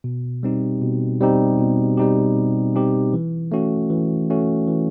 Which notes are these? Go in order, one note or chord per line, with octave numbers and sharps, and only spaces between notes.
B2
G3 C4 D#4 G4
B2
G3 C4 D#4 G4
B2
G3 C4 D#4 G4
B2
G3 C4 D#4 G4
E3
A3 C#4 F#4
E3
A3 C#4 F#4
E3